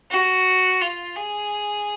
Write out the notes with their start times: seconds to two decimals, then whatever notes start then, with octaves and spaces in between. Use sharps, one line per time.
0.11 F#4
0.81 F4
1.16 G#4